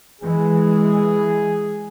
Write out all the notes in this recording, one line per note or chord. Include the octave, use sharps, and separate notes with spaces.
E3 G#3 G#4